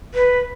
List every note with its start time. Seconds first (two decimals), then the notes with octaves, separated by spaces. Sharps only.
0.14 B4